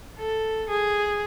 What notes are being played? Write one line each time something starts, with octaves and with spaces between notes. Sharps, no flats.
A4
G#4